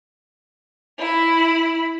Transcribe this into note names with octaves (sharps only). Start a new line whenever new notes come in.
E4 B5